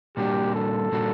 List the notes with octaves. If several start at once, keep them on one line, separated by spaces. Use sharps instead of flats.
A#2 G3 A#3 D4 F#4 G4
A4
A#2 G3 A#3 D4 F#4